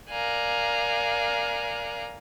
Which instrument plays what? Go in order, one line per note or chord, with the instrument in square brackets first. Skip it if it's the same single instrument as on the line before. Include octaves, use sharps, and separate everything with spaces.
[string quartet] A#4 D5 F5 G#5 A#5 F#6